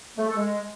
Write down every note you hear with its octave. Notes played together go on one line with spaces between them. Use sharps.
A3
A4
G#3